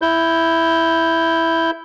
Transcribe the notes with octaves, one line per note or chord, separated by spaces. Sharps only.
E4 G6